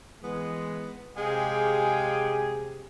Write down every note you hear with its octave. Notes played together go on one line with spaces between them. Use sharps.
E3 G#3 B3
C3 G#3 G4 G#4 F5 G5